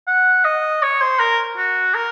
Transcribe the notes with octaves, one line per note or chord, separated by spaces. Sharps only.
F#5
D#5
C#5
C5
A#4
F#4
A#4